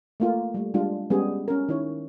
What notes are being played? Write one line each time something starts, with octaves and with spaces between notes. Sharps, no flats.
A3 A#3 F4
G3 A3
G3 G#3 D4 F4
G3 G#3 B3 C#4 G4 G#4
C#4 A#4
D#3 D#4 E4 C#5